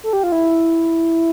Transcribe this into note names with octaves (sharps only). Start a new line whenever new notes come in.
A4
G4
F4
E4